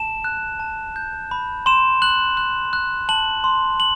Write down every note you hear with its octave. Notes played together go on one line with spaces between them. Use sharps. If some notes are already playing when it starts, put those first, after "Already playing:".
Already playing: A5 E7
F#6
A5
G6
B5
C6 E7
F#6 F#7
F#6
F#6
A5 F#7
C6
F#7